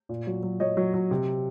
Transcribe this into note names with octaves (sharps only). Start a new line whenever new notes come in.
A#2
F#3
F#3
F#3 C#5 D#5
F#3
F#3
C3